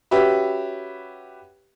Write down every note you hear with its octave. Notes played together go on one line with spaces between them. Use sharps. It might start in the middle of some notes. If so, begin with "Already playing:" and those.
C#4 F#4 G4 B4 E5 B5